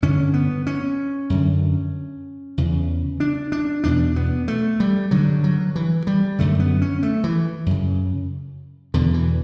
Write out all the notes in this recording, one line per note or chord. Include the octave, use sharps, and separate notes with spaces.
G2 D3 C#4
B3
C#4
F#2 D3
E2 C#3
D4
D4
E2 B2 D4
B3
A3
G3
G2 D3 F#3
F#3
E3
G3
F#2 D3 A3
B3
C#4
A3
E3
F#2 C#3
E2 B2 D3
E3